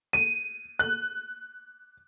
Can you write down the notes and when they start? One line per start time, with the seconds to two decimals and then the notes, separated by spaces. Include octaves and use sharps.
0.13 D#7
0.79 F#6